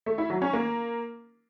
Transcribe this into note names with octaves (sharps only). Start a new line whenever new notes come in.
A3
E4
F#3
C#4
A#3